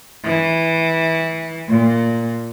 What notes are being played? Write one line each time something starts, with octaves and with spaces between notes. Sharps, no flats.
E3
A#2